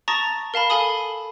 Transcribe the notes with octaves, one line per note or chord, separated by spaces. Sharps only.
A5 A#5 C#6 D#6 A6 A#6
A#4 F5 A5 B5
A4 F5 G#5 B5 D#6